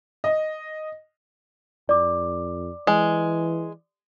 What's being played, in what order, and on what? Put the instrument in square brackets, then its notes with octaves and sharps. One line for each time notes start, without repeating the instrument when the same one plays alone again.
[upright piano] D#5
[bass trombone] F2 [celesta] D5 D6
[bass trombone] E3 [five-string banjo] G#3